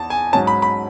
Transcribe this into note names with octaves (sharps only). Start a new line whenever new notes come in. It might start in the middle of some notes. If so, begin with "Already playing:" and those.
Already playing: E2 A5
G#5
G#2 F#3 C#4 A5
B5
B5